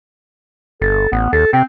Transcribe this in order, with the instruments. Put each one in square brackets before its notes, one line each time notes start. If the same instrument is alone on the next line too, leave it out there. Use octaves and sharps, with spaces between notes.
[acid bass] G1 [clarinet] A4
[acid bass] A1 [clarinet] B3
[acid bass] D#2 [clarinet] A4
[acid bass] C3 [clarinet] C4